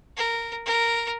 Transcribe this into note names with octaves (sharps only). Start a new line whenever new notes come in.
A#4
A#4